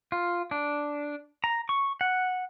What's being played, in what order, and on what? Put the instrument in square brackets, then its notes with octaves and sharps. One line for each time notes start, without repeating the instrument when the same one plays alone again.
[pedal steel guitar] F4
D4
A#5
C#6
F#5